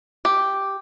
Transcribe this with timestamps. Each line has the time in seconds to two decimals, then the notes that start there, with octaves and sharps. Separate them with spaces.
0.25 G4